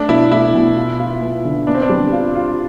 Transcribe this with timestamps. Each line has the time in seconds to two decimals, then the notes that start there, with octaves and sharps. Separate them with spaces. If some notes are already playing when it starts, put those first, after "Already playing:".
Already playing: A3 D4
0.08 B2 E4
0.31 A3 E4
0.54 B2
0.76 F4
0.99 F4
1.21 B3
1.45 D3
1.67 B3 D4
1.75 C4
1.82 D4
1.89 G3
2.12 F4
2.35 F4